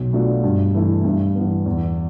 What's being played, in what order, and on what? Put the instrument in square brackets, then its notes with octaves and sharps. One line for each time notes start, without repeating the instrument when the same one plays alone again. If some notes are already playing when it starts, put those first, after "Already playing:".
Already playing: [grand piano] B1
B2 A3 D4 F4
G2
E3 A3 E4
G2
E3 B3
E2